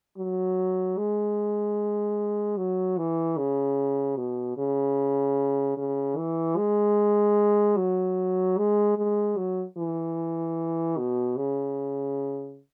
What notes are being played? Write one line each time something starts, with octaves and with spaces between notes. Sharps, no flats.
F#3
G#3
F#3
E3
C#3
B2
C#3
C#3
E3
G#3
F#3
G#3
G#3
F#3
E3
B2
C#3